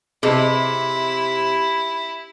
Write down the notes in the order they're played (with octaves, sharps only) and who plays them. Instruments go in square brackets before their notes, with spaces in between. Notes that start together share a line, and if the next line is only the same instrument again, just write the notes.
[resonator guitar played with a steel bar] C3 [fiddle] E4 [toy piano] G#4 B4 D#5